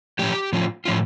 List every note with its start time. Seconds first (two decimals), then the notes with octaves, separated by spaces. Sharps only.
0.19 A2 F3 C#4 F4 G4
0.53 A2 F3 C#4 F4
0.85 A2 F3 C#4 F4